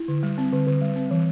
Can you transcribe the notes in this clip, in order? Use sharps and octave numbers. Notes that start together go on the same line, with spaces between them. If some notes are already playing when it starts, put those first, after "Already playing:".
Already playing: E4
D3
G3
C4
D3
D3
G3
C4
E3